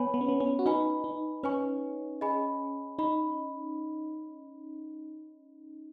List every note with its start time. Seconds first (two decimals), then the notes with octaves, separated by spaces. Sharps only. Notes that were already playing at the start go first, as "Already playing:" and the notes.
Already playing: B3 C#5 G#5 B5
0.14 B3
0.21 C#4
0.29 B3
0.40 C#4
0.59 F#4
0.66 D#4 B4 G#5 B5
1.04 D#4
1.43 C#4 B4 G#5 C#6
2.21 G#4 D#5 G#5 B5
2.99 D#4 B5